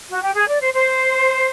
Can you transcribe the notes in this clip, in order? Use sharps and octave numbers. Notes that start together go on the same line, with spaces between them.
F#4
G4
G#4
D5
C5
C5